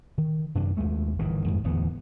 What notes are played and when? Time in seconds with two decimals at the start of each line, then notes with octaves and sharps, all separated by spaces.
0.18 D#3
0.55 F#2 C3 D4
0.77 D#2 G#3 A3
1.19 G1 D#3 E3
1.47 F2 G#2 D#3 G#3
1.64 D1 E2 E3 B3